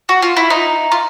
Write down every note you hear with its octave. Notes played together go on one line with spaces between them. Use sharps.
F#4
F4
E4
D#4
F4